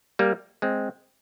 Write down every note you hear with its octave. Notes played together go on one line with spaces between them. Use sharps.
G3 A#3
G#3 C4